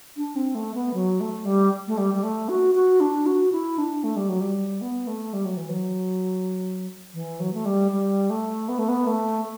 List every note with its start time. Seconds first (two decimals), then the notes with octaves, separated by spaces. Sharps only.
0.17 D4
0.36 C4
0.55 A3
0.75 B3
0.94 F#3
1.20 A3
1.45 G3
1.87 A3
1.98 G3
2.14 G3
2.23 A3
2.49 F#4
2.75 F#4
3.00 D4
3.26 F#4
3.52 E4
3.78 D4
4.04 A3
4.16 G3
4.29 F#3
4.41 G3
4.81 B3
5.07 A3
5.33 G3
5.45 F#3
5.57 E3
5.69 F#3
7.14 E3
7.40 F#3
7.53 A3
7.65 G3
7.92 G3
8.30 A3
8.69 B3
8.79 A3
8.89 B3
9.07 A3